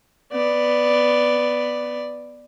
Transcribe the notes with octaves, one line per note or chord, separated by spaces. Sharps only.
B3 D5